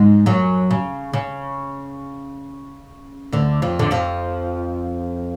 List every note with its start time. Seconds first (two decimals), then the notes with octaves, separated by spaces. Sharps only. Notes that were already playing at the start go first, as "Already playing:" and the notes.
Already playing: G#2 G#3
0.26 F#2 F#3
0.71 C#3
1.13 C#3
3.32 D2 D3
3.62 F2 F3
3.79 D3
3.91 F2 F3